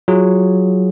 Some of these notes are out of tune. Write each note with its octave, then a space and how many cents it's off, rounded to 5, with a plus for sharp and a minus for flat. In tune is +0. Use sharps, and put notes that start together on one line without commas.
F#3 +0 F4 -5 G#4 +0